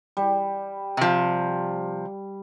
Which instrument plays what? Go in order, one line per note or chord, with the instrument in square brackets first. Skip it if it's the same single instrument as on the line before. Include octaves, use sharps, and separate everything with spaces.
[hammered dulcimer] G3
[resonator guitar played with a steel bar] C3 F3